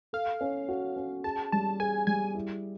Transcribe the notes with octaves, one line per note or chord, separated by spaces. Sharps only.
A4 F5
C#4
F#4
C#4
G#4 A5
G3 A5
G#4 G#5
G3 G#5
E4